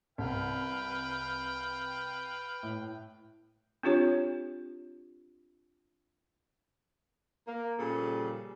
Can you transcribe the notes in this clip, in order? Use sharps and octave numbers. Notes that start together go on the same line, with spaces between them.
C2 B4 F5 G5
A2
C4 D4 F4 G4 C#5
A#3
A#2 C#3 F3 G3 G#4 A4